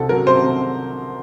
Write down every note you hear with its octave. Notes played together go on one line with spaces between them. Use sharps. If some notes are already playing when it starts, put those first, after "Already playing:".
Already playing: C2 C3 A4
F#3 A#4
C3 C5
C3